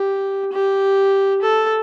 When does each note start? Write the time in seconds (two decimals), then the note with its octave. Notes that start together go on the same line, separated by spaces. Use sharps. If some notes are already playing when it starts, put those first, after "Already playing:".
Already playing: G4
0.52 G4
1.42 A4